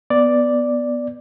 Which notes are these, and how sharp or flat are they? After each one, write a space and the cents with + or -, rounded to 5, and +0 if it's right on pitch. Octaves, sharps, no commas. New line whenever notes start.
B3 +0 D5 +0